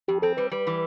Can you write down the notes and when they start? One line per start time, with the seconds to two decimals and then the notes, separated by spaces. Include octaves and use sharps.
0.08 F2 G4
0.22 C4 A4
0.37 G3 B4
0.51 G3 B4
0.67 E3